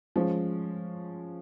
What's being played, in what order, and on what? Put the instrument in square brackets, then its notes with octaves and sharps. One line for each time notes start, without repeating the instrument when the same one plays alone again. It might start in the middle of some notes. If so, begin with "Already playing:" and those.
[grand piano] F3 G#3 C#4